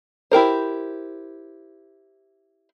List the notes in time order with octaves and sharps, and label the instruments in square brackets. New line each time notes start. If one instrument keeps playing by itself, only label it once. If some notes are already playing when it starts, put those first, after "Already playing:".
[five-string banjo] E4 G4 A#4 C5